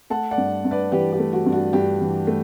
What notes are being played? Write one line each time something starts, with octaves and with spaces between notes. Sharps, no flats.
A3 F#5 A5
D5 F#5
G2
G2
B4 D5
E3 G4 B4
G4
A3
F#4
G2
F#4
G2 G4
E3
A3